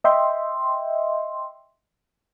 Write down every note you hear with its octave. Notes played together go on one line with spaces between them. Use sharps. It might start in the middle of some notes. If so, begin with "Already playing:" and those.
D#5 E5 G5 C6